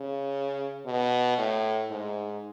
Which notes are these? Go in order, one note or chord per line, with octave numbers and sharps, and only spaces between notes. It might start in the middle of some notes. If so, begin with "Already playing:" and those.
Already playing: C#3
B2
A2
G#2